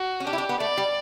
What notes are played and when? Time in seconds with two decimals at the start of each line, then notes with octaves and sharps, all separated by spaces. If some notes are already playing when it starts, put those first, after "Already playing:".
Already playing: F#4
0.20 C#4
0.27 D4 G4
0.33 E4
0.38 D4
0.49 B3
0.60 A3 D5
0.77 G3